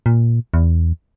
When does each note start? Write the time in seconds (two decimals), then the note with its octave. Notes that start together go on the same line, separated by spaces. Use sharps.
0.06 A#2
0.54 E2